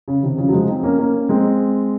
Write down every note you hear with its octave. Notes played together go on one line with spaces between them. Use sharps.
C#3
C3 D#3
C#3 F3
F#3
F3 G#3
C4 D#4
A#3 C#4
A#3 C#4
G#3 C4